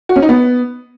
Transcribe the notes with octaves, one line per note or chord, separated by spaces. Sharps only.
F#4
C#4
D#4
B3